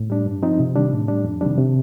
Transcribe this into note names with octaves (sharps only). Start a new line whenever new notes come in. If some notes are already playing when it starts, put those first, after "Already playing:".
Already playing: A2
G3 D4
G2
F3 C4 D#4
C3
D#3 G3 D4
A2
G3 D4
F2
C3 D#3 G3 D4
C3